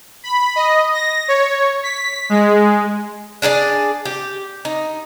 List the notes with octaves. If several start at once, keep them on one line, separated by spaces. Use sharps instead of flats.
B5
D#5
A#6
C#5
B6
G#3
D4 G#4 A4 D5
G4
D#4